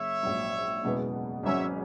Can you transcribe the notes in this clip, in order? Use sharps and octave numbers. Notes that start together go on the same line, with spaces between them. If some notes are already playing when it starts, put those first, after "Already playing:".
Already playing: F#1 C#5 E5
A#1 G#2 F#3
F#1 E2 B2 G#3 B3
G#1 G#2 F#3 C#4 C#5 E5